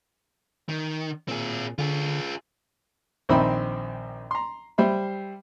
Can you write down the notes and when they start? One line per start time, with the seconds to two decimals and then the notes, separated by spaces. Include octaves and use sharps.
0.69 D#3
1.28 A#2 C4 G#4
1.78 D3 F4 G#4
3.29 A#1 D#3 C4 D#4 E5 B5
4.31 A#5 C6
4.78 G3 C5 E5 B5